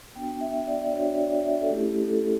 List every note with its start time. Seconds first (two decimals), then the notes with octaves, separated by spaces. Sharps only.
0.16 B3 D4 F#4 G5
0.41 E5
0.67 D5
0.81 D5
0.93 B3 D4 F#4 C#5
1.18 D5
1.44 E5
1.61 A4
1.71 A3 C#4 E4 G4
1.89 G4
2.08 A4